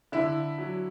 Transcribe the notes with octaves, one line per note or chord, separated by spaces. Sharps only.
D3 E4
F#3